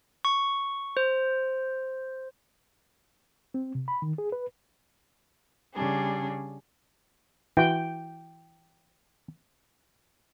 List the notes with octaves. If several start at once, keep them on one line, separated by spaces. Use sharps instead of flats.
C#6
C5
C4
C3
B5
D#3
G#4
B4
C#3 G3 D4 G#4
E3 F#4 G5